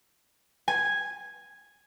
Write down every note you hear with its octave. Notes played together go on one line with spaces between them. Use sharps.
G#5